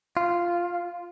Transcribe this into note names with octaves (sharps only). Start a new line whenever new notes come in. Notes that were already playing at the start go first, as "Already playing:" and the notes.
F4